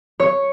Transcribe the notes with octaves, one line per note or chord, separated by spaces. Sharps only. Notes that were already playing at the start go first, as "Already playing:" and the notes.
C#5